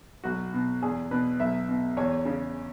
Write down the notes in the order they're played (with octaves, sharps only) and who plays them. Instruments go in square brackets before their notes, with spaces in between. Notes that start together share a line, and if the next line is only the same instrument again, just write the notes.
[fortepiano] B1 F#4
B2
E2 G#4
B2 B4
B1 E5
B2
E2 C#5
C#3